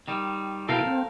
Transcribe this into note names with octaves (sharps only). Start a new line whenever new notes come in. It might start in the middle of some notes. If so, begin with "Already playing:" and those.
D#3 G3
B2 E4 A4 A#4 F5 G5
C4